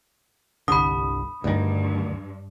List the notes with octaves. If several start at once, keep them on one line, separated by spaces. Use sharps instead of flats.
G1 C2 D3 B5 D#6
D2 G2 D#3